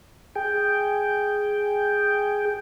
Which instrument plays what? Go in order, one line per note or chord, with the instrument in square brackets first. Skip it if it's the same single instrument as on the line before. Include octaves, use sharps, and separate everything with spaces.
[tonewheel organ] G#4 G5